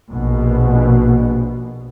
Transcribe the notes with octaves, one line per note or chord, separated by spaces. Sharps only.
A#1 B2